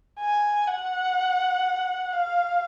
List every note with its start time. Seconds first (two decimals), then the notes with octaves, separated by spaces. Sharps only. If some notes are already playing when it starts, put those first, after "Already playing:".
0.19 G#5
0.68 F#5
2.12 F5